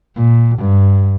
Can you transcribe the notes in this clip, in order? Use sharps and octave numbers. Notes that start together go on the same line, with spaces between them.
A#2
G2